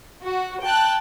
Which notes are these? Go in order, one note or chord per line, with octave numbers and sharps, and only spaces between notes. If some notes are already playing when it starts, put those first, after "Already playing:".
F#4
G5 A5 F#6